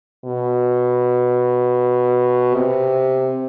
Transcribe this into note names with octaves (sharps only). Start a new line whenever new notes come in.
B2
C3